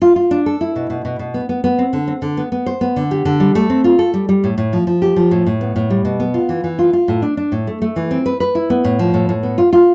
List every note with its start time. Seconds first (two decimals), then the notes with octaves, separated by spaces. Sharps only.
0.02 F4
0.16 F4
0.31 D4
0.46 A4
0.61 E4
0.76 B2
0.90 B2
1.05 B2
1.19 B2
1.34 B3
1.49 B3
1.64 B3
1.79 C4
1.93 D3
2.08 C4
2.22 D3
2.37 B3
2.52 B3
2.66 C5
2.81 B3
2.96 D3
3.11 G4
3.25 D3
3.40 G3
3.55 A3
3.70 C4
3.84 F4
3.99 A4
4.14 G3
4.29 G3
4.44 A2
4.58 A2
4.73 F3
4.87 F3
5.02 G4
5.16 F3
5.31 A2
5.46 A2
5.61 B3
5.76 A2
5.90 G3
6.05 B2
6.20 B3
6.34 F4
6.49 E3
6.64 E3
6.79 F4
6.93 F4
7.08 A2
7.22 D4
7.37 D4
7.52 A2
7.67 A3
7.82 A3
7.96 E3
8.11 C4
8.26 B4
8.40 B4
8.55 E4
8.70 B3
8.84 A2
8.99 F3
9.14 A2
9.29 A2
9.43 B3
9.58 F4
9.73 F4